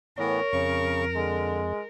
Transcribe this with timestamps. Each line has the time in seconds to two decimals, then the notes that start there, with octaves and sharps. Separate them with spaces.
0.18 A2 E3 B3 A#4 C#5
0.52 F2 C#3 C#6
1.16 D3 G#3